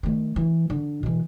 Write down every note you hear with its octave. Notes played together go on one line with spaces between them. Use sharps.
D#3 A3
E3
D3
B2 E3